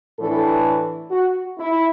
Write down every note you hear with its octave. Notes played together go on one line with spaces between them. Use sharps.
A2 E3 D4 A4
F#4
E4